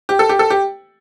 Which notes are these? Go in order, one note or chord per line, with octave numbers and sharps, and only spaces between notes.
G4
A4
G4
A4
G4